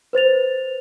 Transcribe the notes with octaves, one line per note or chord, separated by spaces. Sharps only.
B4 C5 A6 F7